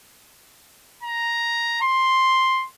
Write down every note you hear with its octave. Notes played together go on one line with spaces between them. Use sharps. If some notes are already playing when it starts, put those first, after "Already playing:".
A#5
C6